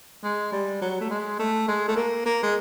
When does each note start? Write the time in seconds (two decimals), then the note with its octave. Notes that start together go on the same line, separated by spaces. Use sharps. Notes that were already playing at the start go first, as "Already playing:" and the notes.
0.24 G#3
0.53 G3
0.81 F#3
1.01 A3
1.10 G#3
1.39 A3
1.68 G#3
1.88 A3
1.96 A#3
2.26 A#3
2.43 G#3